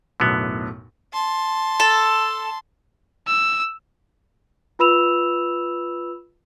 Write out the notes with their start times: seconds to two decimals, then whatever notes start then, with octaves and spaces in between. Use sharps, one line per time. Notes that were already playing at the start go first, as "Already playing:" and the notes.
0.20 B1 F#2 A2 D3 B3
1.13 A5 C6
1.80 A4
3.28 E6
4.79 F4 B4 B5 E6 E7 F7